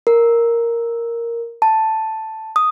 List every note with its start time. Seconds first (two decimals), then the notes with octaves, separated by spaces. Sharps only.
0.07 A#4
1.62 A5
2.56 D#6